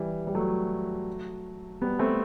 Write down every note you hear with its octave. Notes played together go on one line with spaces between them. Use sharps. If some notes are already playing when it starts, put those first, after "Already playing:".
Already playing: E3 G3
G3
F#3 A3
G3 B3
A3 C4